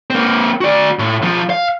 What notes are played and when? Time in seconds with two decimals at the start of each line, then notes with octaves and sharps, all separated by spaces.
0.10 A#3 C4
0.61 F#4 D5
0.99 A2
1.22 B1 F3
1.50 F5